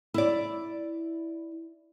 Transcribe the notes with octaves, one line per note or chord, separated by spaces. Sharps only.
E4 D5